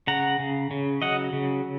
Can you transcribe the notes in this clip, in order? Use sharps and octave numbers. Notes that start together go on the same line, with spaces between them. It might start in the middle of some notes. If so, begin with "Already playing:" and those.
C#3 F#5 A#5
C#3
C#3
F#3 D#5 F#5
C#3